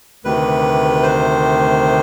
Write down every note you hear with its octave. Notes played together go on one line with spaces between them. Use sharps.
D2 C3 D#3 B4
C5